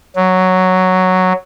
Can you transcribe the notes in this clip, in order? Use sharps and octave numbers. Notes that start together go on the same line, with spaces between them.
F#3